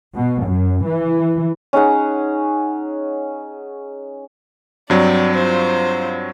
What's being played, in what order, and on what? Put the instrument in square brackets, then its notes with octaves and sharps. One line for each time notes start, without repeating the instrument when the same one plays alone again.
[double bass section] B2
F#2
E3
[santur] C#4 D#4 G#4 F#5
[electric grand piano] G2 F#3 C4 [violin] D5
[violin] F4 C5